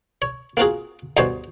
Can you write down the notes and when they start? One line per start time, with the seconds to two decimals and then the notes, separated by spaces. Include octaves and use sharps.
0.22 C#5
0.57 A#3 C4 F4 F#4 G#4
1.17 D2 G2 B2 E3 C5 C#5